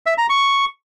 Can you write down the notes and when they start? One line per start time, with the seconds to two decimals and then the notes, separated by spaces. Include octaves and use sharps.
0.06 E5
0.18 A#5
0.29 C#6